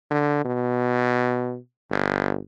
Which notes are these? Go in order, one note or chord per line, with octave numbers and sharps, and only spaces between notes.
D3
B2
G1